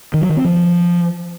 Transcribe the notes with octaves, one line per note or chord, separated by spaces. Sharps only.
D#3
F#3
D#3
C4
F3